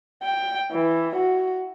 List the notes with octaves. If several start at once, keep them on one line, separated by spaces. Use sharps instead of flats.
G5
E3
F#4